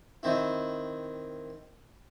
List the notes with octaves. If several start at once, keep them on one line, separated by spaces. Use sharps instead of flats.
D#3 C4 E4